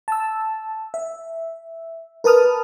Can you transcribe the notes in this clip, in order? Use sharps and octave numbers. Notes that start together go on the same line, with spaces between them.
A5 E6
E5
A#4 B4 A5 D#6 F6